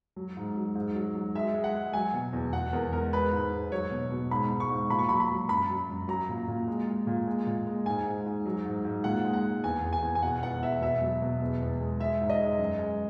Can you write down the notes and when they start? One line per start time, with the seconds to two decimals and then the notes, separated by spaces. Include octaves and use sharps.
0.16 F#3
0.37 G#2
0.56 F#3
0.75 G#2
0.95 F#3
1.15 F#3
1.35 G#3 E5
1.54 G#3
1.64 F#5
1.75 G#3
1.93 F#3 G#5
2.14 B2
2.33 E2
2.53 E2 F#5
2.73 E2 A#4
2.93 G#3 A#4
3.12 G#3 B4
3.33 G#2
3.52 G#2
3.71 F#3 C#5
3.91 B2
4.12 B2
4.31 G#2 B5
4.51 G#2
4.60 C#6
4.70 G#2
4.90 A#2 B5
4.99 C#6
5.09 F#3 B5
5.20 B5
5.30 F#3
5.49 F#2 B5
5.69 F#3
5.89 F#2
6.08 F#3 A#5
6.29 A#2
6.48 A#2
6.68 G#3
6.88 G#3
7.07 A#2
7.27 G#3
7.47 A#2
7.67 G#3
7.86 G#2 G#5
8.06 G#2
8.26 G#2
8.46 F#3
8.65 G#2
8.85 G#2
9.04 A#2 F#5
9.25 G#3
9.33 F#5
9.44 G#3
9.64 E2 G#5
9.84 E2
9.93 G#5
10.02 E2
10.15 G#5
10.22 B2 F#5
10.42 E2 F#5
10.62 E2 E5
10.81 B2 E5
11.02 F#3
11.22 B2
11.42 E2
11.61 E2
11.81 G#3
12.00 G#3 E5
12.21 G#2
12.30 D#5
12.40 G#3
12.59 F#2
12.79 G#3